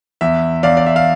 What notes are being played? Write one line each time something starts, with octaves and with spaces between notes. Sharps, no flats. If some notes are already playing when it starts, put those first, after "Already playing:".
E2 E5
E2 D5 F5
D5
E5
F5